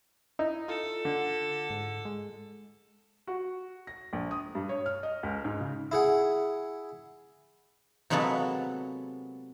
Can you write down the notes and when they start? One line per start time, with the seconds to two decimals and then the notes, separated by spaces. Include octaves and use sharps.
0.39 D#4 E4
0.68 F4 A4
1.05 D3
1.70 G#2
2.05 G#3
3.27 F#4
3.87 A#6
4.13 A#1
4.31 D#6
4.55 G2
4.69 C#5
4.86 F6
5.03 D#5
5.23 C#2
5.45 G#2
5.60 C#3
5.91 E4 G#4 F#5
8.10 C3 F#3 G#3 A#3 B3 A4